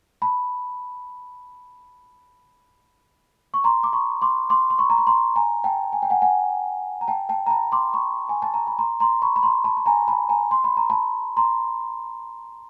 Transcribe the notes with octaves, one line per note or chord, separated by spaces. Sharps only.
A5 B5
C#6
A#5 C6
D6
B5 C#6
C6 D6
C6 D6
C6
B5 C#6
A#5
B5
A#5 C6
G#5 A#5
G5 A5
G#5
G5
F#5 G#5
F#5 G#5
A#5
G5 A5
G5 A5
A#5
A5 B5
C6 D6
B5 C#6
G#5
A5
A#5
B5
A#5 C6
A#5 C6
B5 C#6
B5
A#5 C6
A5 B5
A5
G#5 A#5
A5 B5
G#5 A#5
C6
B5
A#5
A5 B5
A#5 C6